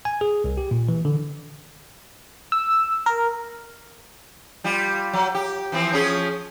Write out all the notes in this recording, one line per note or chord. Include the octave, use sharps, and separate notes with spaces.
G#5
G#4
C2
G4
A#2
E3
D3
E6
A#4
G3 F4
F#3
G4
E3 F3 C4
F3 C#4 G#4